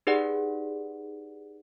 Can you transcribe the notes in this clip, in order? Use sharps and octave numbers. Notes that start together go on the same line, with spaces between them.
D#4 G4 G#4 B4 D5 F#5